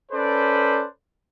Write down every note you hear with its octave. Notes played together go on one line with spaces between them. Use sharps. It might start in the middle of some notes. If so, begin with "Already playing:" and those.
C#4 A4 B4 C5 D5